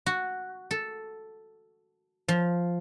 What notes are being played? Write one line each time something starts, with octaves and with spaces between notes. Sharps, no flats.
F#4
A4
F3